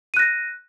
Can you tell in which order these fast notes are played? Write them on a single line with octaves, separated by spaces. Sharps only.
D#7 F#6 A#6